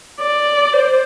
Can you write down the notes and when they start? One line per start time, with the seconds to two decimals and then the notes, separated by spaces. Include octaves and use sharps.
0.21 D5
0.73 C5